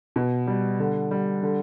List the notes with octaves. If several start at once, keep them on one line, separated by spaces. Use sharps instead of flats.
B2
G3
D3
G3
D3